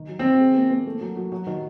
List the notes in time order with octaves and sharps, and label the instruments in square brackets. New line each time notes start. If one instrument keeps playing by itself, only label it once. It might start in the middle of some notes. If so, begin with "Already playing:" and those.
Already playing: [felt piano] D#3
F#3
[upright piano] C4
[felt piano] D#3
G#4
A#3
A#3
A3
F#3
F#3
F#3
D#3